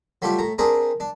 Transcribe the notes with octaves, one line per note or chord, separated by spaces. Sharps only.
F#3 G3 A3 F4 G4
A2 A#5
C4 D4 G#4 A#4 A#5 B5
D4